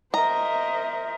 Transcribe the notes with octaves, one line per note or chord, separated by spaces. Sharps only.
A#4 C5 D#5 E5 A#5